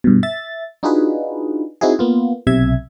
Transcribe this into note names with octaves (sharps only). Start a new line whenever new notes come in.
G2 B2
E5 A6
D4 D#4 F4 F#4 G#4 B4
C4 D#4 E4 F#4 G#4
A#3 B3 F4
B1 C3 E5 G#6